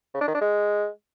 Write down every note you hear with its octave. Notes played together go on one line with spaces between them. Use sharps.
C#3
D4
D#3
D4
G#3